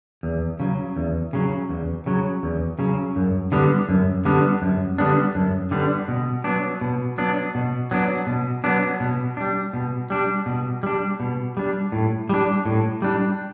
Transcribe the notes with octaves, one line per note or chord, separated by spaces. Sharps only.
E2
C#3 F#3
E2
C#3 F#3
E2
C#3 F#3
E2
C#3 F#3
F#2
D3 G3 B3 D4
F#2
D3 G3 B3 D4
F#2
D3 G3 B3 D4
F#2
D3 G3 B3 D4
B2
F#3 B3 D4
B2
F#3 B3 D4
B2
F#3 B3 D4
B2
F#3 B3 D4
B2
G3 D4
B2
G3 D4
B2
G3 D4
B2
G3 D4
A2
G3 D4
A2
G3 D4